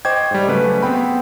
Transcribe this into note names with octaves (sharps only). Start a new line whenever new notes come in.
C5 D#5 G5 C#6 D6 G#6
G#2 G3
C#3 F#3 A3 C#4 B4
B3 C4 G5 B5